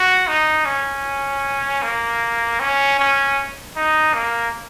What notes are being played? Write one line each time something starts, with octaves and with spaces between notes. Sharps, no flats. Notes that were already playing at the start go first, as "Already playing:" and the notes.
Already playing: F#4
D#4
C#4
A#3
C#4
C#4
D#4
A#3